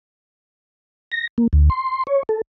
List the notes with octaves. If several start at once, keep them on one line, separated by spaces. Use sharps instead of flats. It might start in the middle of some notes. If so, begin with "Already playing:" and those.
A#6
A#3
D2
C6
C#5
A4